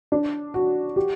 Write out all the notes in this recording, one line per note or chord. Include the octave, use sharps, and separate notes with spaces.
D4
F#4
G4